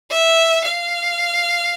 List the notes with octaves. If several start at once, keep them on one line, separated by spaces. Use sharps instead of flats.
E5
F5